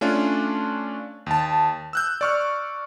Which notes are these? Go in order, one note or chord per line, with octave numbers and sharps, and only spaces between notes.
A3 C#4 D4 F4
D#2 A5
E6 F#6 G6
D5 C#6 F6